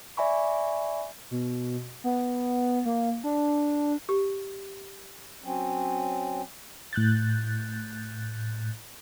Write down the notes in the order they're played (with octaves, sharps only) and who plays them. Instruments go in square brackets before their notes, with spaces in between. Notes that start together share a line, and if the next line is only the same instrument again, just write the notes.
[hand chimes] D5 E5 G#5 B5 C#6
[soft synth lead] B2
B3
A#3
D4
[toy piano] G4
[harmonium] F#3 C4 C#4
[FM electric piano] A2 F#6 G6 A6